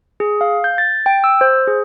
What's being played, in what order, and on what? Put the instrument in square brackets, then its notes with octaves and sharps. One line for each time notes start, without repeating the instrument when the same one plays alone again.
[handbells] G#4
F5
G6
A6
G5
E6
C5
G#4